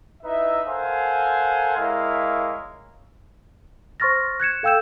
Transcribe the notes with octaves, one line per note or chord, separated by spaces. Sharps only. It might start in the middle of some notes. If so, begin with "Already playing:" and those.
D#4 E4 B4 E5
A4 A#4 C5 F5 F#5 G#5
G#3 E4 A#4 C#5 F5
C5 C6 C#6 F6 A6 A#6
F#6 G#6 C#7 E7
A4 F5 G5 E6 G6 E7